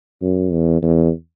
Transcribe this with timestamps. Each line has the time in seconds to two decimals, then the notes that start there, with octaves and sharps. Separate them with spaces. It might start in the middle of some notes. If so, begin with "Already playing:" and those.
0.22 F#2
0.52 E2
0.83 E2